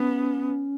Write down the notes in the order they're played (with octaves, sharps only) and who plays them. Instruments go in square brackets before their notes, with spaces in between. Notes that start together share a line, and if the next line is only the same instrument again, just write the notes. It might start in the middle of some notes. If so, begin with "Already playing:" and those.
Already playing: [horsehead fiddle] B3 [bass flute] C#4